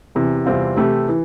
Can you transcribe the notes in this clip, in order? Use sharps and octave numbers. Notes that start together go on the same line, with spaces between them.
E2 C3 E3
E2 C3 G3 C4 F4
C3 E3 A3 E4 G4
E3